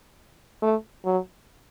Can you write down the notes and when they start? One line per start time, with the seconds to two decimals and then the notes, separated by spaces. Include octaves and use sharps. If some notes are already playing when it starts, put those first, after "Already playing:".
0.62 A3
1.05 F#3